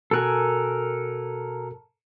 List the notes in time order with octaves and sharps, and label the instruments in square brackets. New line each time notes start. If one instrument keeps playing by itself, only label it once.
[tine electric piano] B2 F#4 F#6 [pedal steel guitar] A4 A#4 G#5